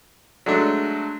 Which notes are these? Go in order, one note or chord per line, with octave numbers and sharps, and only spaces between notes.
F#3 G#3 A3 D4